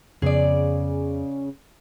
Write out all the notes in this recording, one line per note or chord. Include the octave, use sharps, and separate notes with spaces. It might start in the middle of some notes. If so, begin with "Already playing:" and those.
F2 C#3 B3 G#4 D5